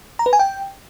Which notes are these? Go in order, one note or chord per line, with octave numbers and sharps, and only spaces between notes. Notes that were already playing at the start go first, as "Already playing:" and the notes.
A#5
B4
G#5
G5